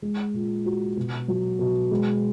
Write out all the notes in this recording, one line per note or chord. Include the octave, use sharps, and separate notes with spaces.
G#3
A#2
F#4
B2
F#3
B2
G#3